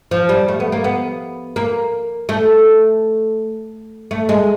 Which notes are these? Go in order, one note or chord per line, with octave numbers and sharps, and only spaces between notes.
F3
G3
A3
B3
A#3
B3
A#3
A3
A3
G#3